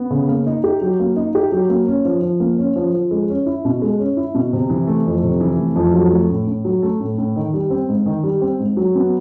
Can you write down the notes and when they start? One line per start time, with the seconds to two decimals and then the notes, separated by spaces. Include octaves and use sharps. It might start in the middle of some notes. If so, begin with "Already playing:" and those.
Already playing: B3
0.11 C#3
0.28 A#3
0.46 D#4
0.64 G4
0.81 F#3
1.00 A#3
1.16 D#4
1.35 G4
1.52 F#3
1.69 A#3
1.87 C#4
2.05 F3
2.22 F3
2.40 A#3
2.59 C#4
2.76 F3
2.94 F3
3.11 G#3
3.29 C#4
3.46 E4
3.65 B2
3.82 G#3
3.99 C#4
4.17 E4
4.35 B2
4.53 C3
4.70 E3
4.88 A3
5.06 F2
5.23 C3
5.40 E3
5.58 A3
5.76 F2
5.94 F#3
6.12 A3
6.29 A2
6.47 A2
6.65 F#3
6.83 A3
7.00 A2
7.18 A2
7.36 D#3
7.54 G3
7.70 C4
7.89 G#2
8.06 D#3
8.24 G3
8.41 C4
8.59 G#2
8.77 F#3
8.95 B3